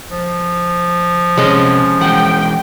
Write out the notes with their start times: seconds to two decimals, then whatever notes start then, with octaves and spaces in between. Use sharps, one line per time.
0.11 F3
1.38 C3 G#3 C#4 D#5
2.01 E3 G#3 F#5 G5